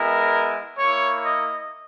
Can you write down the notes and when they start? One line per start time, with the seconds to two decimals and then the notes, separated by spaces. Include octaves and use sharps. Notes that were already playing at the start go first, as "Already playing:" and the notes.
Already playing: G#3 B3 E4 A#4
0.78 A#3 E4 C#5
1.25 D#5